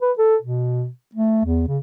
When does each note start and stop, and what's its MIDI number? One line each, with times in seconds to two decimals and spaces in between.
0.02 0.12 71
0.18 0.36 69
0.42 0.88 47
1.15 1.43 57
1.45 1.67 40
1.68 1.79 49